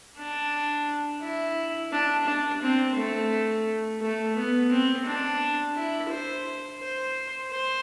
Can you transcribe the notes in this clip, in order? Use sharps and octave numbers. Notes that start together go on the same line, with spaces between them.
D4
E4
D4
D4
C4
A3
A3
B3
C4
D4
E4
C5
C5
C5